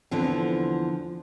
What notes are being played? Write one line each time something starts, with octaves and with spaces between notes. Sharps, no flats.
E2 D3 F3 B3 C4